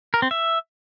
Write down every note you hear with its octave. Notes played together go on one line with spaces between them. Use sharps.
A#4
C4
E5